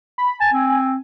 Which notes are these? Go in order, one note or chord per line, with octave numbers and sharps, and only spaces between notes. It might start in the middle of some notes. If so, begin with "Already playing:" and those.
B5
G#5 A5
C4